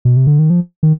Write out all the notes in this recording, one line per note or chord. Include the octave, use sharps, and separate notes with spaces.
B2
C3
D3
D#3
F3
D#3